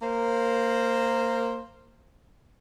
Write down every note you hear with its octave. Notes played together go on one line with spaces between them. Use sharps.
A#3 C5